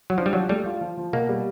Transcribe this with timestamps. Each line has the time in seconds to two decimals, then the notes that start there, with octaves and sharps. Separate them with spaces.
0.10 F#3
0.18 F3 D4
0.26 G3
0.33 F3 F#3
0.49 G3 A3
0.66 F4
0.81 F3
0.97 F3
1.13 B2 A#3
1.29 G3